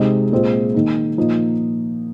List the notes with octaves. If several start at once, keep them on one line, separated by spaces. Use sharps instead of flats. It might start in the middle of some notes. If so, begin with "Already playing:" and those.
Already playing: C3 G#3 D#4
A#2 G#3 C4 F4
D#3 A#3 D#4
A#2 F3 A#3 D#4